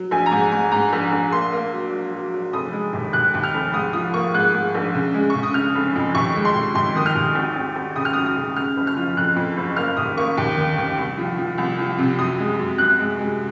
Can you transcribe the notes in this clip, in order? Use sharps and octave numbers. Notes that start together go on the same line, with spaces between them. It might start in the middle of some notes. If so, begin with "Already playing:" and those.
Already playing: F#3
A#1 G#5
A#5
G#2 G#5
G#2 G#5
G#2 A#5
A#1
A#1
A#3 C6
A#3
F#3
F#3
F#3
F#3
F1 D#6
G#3
D#2
D#2 F#6
D#2
F6
F1
G#2 D#6
F3 D#6
A#3 C#6
G#2 F#6
G#2
A#1
C#3
G#3
C#6
C#3
D#6
C#3 F6
F1
F2
D#2 C#6
G#3
C6
D#2
D#2 C6
D#3 D#6
F6
D#2
G#1
G#1
G#1
C#3 D#6
F6
F#2 D#6
D#6
C#3
C#3 F6
F#1
F6
F3
F2 F#6
F2
F#1
A#3 F6
D#2 D#6
A#3 C#6
D#2
D#3
D#3
C2
F3
F3
C2
F3
C3
F#2 D#6
G#3
F#2
F#2 F#6
G#3
G#3